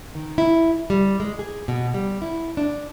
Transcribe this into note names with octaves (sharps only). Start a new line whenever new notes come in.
D#3
E4
G3
G#3
G#4
B2
G3
E4
D4